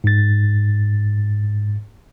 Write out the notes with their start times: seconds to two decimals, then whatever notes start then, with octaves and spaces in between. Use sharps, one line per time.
0.04 G#2 A6